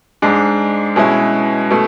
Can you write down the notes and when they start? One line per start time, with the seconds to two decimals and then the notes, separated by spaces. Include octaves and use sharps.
0.22 G#2 G#3 D4
0.96 B2 G#3 C#4 E4
1.71 B2 A3